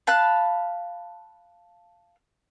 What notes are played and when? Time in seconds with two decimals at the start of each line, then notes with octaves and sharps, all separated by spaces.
0.07 F5 A5 B5 F#6